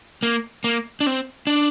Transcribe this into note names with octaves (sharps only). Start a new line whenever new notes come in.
A#3
A#3
D4
C4
D4